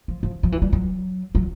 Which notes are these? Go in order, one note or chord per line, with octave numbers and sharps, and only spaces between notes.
F3
F3
F3
E3
G3
F#3
F#3